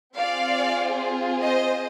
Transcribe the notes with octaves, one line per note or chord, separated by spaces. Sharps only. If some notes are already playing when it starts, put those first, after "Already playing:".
C4 F4 G#4 D5 F5
C5 D#5